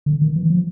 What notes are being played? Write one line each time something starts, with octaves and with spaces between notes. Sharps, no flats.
D3
D#3
E3
F3